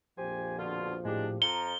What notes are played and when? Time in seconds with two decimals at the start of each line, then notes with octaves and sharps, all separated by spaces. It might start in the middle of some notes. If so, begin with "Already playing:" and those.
0.18 A#1 F2 F3 G4 C5 G#5
0.59 B2 D3 F4
1.05 A2 G#3 D4 G4
1.42 F2 F3 A#5 C#7 G7